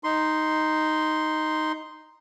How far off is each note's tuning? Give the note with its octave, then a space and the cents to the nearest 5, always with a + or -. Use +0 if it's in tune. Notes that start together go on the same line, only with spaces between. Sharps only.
D#4 +0 C6 +0